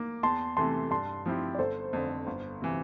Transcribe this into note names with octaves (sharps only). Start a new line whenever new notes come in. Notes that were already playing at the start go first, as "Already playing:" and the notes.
Already playing: A#3 D6
E2 A5 C6
C3 E3 A3 A5 C6
G2 A5 C6
F3 C4 E4 G4
D5
G1 A4 C5
F2 D3
G1
C3 E3